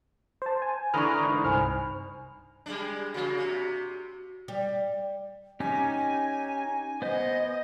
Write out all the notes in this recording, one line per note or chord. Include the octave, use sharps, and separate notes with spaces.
C5 A5
G#5
D3 E3 D4 A#5 B5 C#6 D#6 F6
G#1 D#3
C2 G2 C5 G#5 B5 F6
G3 G#3 D4
C#3 A#3 F#4
C3
G3
C#4 D#4 G4 G#5
B3 C5 D#5 G#5